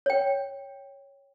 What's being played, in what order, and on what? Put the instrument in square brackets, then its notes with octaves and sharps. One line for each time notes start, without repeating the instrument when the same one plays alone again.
[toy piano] C#5 G5